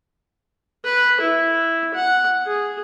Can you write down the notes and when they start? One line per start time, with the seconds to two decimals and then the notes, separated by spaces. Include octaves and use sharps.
0.85 B4
1.21 E4
1.94 F#5
2.47 G#4